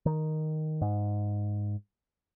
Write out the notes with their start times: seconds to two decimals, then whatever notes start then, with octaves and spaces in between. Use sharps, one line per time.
0.06 D#3
0.82 G#2